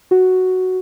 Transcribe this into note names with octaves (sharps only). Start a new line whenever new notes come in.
F#4